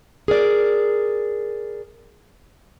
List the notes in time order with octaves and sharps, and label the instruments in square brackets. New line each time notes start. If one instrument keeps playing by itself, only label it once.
[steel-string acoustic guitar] G#4 A#4 D5